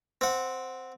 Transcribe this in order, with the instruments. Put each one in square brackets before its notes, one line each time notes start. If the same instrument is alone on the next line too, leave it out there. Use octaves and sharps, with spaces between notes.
[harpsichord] C4 F#5